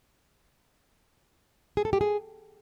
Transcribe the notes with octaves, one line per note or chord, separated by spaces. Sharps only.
G#4
A4
G4
G#4